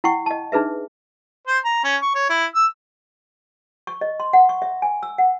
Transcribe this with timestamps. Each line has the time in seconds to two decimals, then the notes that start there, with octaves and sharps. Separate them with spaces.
0.04 E4 F#5 G5 C#6
0.26 D#5 A5
0.52 D4 D#4 G#4 B4 E5
1.47 C5
1.65 A#5
1.84 C#4
2.02 C#6
2.15 C#5
2.30 E4
2.55 E6
3.87 C#6
4.01 D#5
4.20 C6
4.33 F#5
4.49 C#6
4.62 E5
4.82 G#5
5.03 E6
5.18 F#5